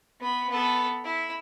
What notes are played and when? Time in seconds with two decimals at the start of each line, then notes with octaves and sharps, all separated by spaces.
0.20 B3 B5
0.50 B3 A4
1.04 E4